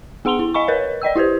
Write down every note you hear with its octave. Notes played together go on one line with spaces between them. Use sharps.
B3 G#4 F#5 C6 F7 G7
E4
D#5 F5 G#5 B5 C#6
A#4 B4 C#5 D#5
D5 D#5 G5 E6
E4 G4 B4 C5